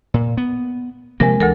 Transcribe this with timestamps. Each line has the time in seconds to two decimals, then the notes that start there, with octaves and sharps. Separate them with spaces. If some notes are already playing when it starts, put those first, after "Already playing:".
0.14 A#2
0.37 B3
1.20 C3 F3 G#3 A#3 A#4
1.40 D2 E3 A4 A#4